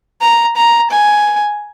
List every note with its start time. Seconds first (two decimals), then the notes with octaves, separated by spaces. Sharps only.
0.21 A#5
0.56 A#5
0.90 G#5